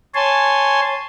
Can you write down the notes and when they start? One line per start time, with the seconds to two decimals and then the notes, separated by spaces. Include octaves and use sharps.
0.15 C#5 G#5 A5 C6